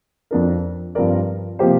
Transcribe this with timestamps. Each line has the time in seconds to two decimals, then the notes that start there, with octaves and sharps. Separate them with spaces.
0.31 F2 F3 D4 A#4
0.95 G2 F3 C4 A#4 D5
1.59 C3 F3 A#3 G4 C5